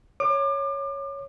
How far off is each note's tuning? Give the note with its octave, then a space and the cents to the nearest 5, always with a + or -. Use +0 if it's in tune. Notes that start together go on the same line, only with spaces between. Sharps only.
C#5 +0 D6 +35